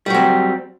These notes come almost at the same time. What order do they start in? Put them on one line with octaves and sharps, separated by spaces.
G3 F#3 C4